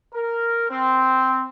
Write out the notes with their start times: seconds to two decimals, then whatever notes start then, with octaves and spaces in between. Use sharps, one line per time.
0.14 A#4
0.70 C4